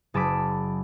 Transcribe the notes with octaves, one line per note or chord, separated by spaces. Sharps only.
F#1 G#4 A5 B5 D6 B6